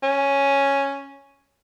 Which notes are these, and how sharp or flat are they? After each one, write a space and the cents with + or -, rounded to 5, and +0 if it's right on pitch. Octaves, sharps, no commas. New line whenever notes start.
C#4 +0